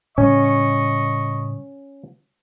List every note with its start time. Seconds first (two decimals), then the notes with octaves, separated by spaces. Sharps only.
0.18 A2 C#3 G3 C#4 D#5 C#6